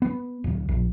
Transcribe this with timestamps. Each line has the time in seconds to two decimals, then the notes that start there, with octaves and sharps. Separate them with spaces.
0.02 B3
0.44 D1
0.69 A#1